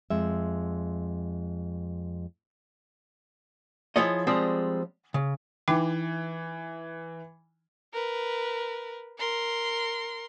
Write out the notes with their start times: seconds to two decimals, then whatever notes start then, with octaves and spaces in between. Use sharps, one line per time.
0.10 F2 G#3 E5
3.96 F3 E4 F4 G#4 C#5 D#5
4.27 F3 G3 G#3 C4 G#4 D5
5.14 C#3
5.68 E3 D#4 G5 D6
7.93 A#4 B4
9.18 A#4 C6